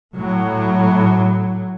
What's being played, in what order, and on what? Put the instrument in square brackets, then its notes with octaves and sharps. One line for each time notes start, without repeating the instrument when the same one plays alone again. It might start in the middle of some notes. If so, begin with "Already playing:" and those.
[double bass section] A2 F#3